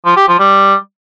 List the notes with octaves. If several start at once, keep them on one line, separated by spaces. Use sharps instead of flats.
F3
G4
F3
G3